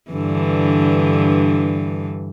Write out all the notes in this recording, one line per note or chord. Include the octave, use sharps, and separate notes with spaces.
G2 D3 E3